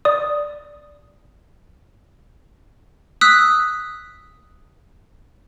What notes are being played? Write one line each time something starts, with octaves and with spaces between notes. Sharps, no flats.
D5 D#6
D#6 E6 F#6 B6